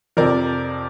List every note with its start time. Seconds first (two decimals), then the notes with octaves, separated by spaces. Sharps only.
0.17 F2 C3 F3 A#4 D5